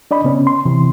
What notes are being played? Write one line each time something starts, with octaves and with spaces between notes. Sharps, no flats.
D4 D5 D#5 B5
C#3 B3 C#4
C6
C3 E3